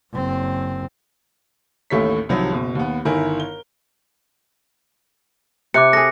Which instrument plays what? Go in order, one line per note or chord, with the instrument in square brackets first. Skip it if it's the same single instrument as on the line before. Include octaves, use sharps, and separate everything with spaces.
[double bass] F#1 C4
[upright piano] A1 D#2 A2 A3 C#5 B6
C2 C3 D#3 F3 F#3
F#1 B2
D#2 B3
G1 D#3 E4 A#4 G#5
A#4 G7
[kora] C3 [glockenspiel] D6 F#6 C#7
[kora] G#4 A4 [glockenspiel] A#6